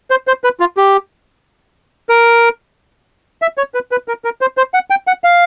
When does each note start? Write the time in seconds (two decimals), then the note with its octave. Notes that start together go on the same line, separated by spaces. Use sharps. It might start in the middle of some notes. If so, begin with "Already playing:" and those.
0.11 C5
0.27 C5
0.44 B4
0.60 F4
0.77 G4
2.09 A#4
3.42 E5
3.58 C#5
3.74 B4
3.91 B4
4.08 A#4
4.25 A#4
4.41 C5
4.57 C5
4.74 F#5
4.90 G5
5.07 F#5
5.24 F5